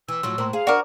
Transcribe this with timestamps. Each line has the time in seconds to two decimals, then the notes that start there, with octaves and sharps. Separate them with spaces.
0.08 E3 E6
0.23 A2 F3 F#3 C6
0.38 A2 A#3 C5 A#5 C6
0.53 G#4 F5
0.67 D4 F#4 A#4 D5 D6